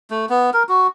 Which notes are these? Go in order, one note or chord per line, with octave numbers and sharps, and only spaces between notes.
A3
B3
A#4
F#4